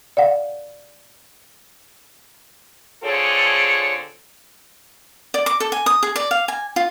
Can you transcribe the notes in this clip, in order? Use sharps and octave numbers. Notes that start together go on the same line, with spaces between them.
D5 F5 F#5
D3 C4 F4 G#4 A4 C#5
D5
D6
A4
G#5
D#6
G#4
D5
F5
G#5
F4